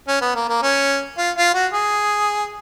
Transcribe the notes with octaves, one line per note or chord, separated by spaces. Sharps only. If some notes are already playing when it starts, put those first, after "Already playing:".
C#4
B3
A#3
A#3
C#4
F4
F4
F#4
G#4